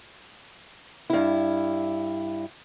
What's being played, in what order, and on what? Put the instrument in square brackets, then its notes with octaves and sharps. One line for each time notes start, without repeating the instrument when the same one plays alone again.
[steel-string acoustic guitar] G2 E4